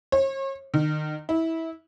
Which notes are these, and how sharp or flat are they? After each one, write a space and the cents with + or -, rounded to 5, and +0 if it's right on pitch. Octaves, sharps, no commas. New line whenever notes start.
C#5 -40
D#3 -35
E4 -20